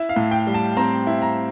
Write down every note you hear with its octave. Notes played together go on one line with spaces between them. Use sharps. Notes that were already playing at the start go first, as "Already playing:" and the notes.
Already playing: E4 E5
F5
A2
G5
G3
A5
C4 A#5
E4
A#5